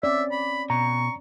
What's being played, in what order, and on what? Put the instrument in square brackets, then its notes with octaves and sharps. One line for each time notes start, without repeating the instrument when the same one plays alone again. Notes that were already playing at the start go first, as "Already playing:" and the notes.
[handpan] C4 C#4 D5 [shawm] E5
[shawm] B5
[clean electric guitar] B2 [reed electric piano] A#5 [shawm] C#6